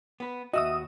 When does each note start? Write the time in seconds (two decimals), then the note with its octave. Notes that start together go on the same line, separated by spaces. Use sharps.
0.20 B3 B4
0.53 D#2 G#2 F#4 D#5 E5 D#6